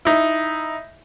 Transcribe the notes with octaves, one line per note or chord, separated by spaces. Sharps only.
D#4 E4